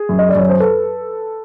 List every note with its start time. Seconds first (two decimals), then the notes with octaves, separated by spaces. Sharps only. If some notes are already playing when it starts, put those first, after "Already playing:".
Already playing: G#4
0.09 F#2
0.19 D#5
0.29 D5
0.35 F#2 C#5
0.49 C5
0.60 A4 B4